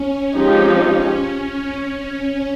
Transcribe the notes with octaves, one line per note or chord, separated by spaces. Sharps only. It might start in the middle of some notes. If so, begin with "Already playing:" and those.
Already playing: C#4
F3 G#3 C4 D#4 G4